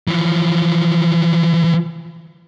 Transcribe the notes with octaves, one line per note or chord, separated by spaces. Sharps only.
E3 F3